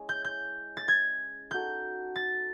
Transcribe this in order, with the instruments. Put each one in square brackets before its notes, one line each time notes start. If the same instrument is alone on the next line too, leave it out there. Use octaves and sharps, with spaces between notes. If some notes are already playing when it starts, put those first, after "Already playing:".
Already playing: [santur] G#3 C#4 E4
[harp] G6
G6
A6
G#6
[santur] D#4 F#4 A4 [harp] G6
[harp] A6